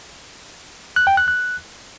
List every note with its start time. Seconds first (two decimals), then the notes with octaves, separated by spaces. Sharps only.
0.96 F#6
1.07 G5
1.17 F#6
1.28 F#6